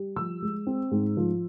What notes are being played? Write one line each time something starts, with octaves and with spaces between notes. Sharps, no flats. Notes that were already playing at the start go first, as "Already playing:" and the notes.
Already playing: G3
F3 E6
G#3
C4
G#2
F3